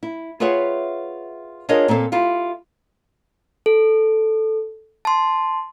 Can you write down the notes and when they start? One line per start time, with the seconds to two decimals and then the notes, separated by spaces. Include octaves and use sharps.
0.03 E4
0.40 F4 G#4 B4 C#5 E5 F#5
1.69 D4 F4 G#4 A#4 C#5 D#5
1.88 A#2 A#3 C4 A4
2.12 E4 F4 G4 F5
3.66 A4
5.05 A5 C6